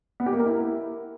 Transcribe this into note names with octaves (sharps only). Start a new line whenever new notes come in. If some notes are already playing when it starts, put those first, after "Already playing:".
B3
G4
A#3
A#4
E4